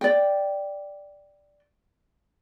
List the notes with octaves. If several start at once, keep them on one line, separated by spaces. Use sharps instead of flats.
D5 G5